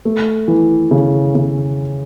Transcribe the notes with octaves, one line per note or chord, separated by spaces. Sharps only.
A3
E3
C#3
C#3